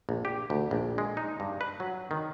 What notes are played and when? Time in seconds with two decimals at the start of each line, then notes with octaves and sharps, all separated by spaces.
0.09 A#1
0.25 G4
0.50 D2
0.71 A#1
0.98 G#3
1.17 D#4
1.40 G2
1.61 B4
1.80 F#3
2.11 D#3